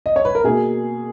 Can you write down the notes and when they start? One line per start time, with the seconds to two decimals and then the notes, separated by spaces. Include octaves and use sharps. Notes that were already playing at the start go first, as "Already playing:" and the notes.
0.06 D#5
0.16 C#5
0.25 B4
0.35 A#4
0.44 B2 A#3 G#4